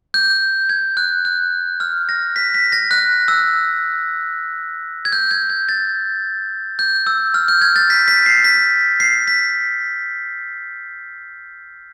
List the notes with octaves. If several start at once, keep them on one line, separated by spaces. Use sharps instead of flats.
G6
G#6
F#6
F#6
F6
A#6
B6
B6
A#6
F#6
E6
G#6
G6
G#6
G#6
A6
G6
E6
F6
G6
G#6
A6
B6
B6
C7
B6
C7
B6